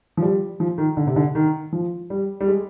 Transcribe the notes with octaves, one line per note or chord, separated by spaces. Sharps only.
F3
G3
F3
D#3
D3
C3
D3
D#3
F3
G3
G3
G#3